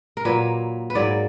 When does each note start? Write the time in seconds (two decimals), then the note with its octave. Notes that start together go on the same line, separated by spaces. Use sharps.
0.17 A#4
0.25 A#2 F#3 A#3 B4
0.90 B4
0.95 G#2 F#3 A#3 D5